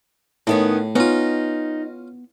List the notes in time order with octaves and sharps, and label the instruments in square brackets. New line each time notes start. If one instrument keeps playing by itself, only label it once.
[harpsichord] A2 [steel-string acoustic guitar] D#3 B3 C#4
[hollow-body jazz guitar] B3 [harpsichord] C#4 F4 [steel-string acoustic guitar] D#4